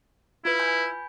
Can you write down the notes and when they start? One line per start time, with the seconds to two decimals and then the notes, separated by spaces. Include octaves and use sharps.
0.45 E4 F4 B4
0.60 G#5 B5 G6